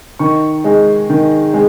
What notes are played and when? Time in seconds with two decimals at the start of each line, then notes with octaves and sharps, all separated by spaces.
0.19 D#3 C#6
0.64 G#3 D#4
1.10 D#3
1.54 G#3